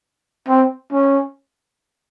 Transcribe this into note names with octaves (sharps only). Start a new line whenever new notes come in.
C4
C#4